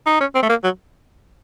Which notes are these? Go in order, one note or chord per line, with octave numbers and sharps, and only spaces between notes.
D#4
C#4
C4
A3
A#3
F#3